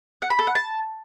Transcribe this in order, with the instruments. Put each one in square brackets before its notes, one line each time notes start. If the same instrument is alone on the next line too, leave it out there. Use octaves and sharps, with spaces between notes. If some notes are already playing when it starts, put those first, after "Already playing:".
[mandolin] F#5
B5
A4
F#5
A5